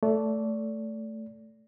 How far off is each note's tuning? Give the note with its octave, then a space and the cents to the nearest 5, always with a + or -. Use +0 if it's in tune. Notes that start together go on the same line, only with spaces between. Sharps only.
A3 +0 D5 -25